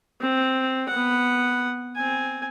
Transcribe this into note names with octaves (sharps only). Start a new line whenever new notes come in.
C4
B3 F#5
C4 G#5